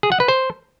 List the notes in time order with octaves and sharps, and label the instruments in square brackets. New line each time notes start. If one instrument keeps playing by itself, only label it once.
[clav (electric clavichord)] G#4
F#5
B4
C5